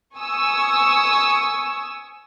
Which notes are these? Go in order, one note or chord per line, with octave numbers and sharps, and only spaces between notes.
G#5 C#6 D#6 E6